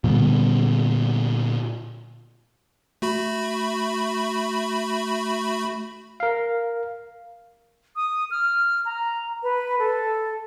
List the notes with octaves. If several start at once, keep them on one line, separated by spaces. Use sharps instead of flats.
A#2 D3 G3 B3
A3 F#4 B5
A#4 F5
D#6
F6
A#5
B4
A4